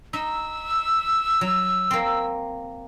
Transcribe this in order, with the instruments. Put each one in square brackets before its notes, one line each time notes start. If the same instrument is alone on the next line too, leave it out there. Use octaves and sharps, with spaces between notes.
[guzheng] D#4 D#5 [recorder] E6
[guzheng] F#3
A#3 C4